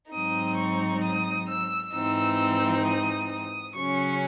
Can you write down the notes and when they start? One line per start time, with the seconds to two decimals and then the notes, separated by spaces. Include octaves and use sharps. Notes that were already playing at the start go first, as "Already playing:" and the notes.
0.12 G#2 F#3 C4 D#4 D#6
0.58 C#6
1.03 D#6
1.49 E6
1.94 G#2 E3 C4 D#4 E6
2.85 D#6
3.31 D#6
3.76 C#3 F#3 C#4 C#6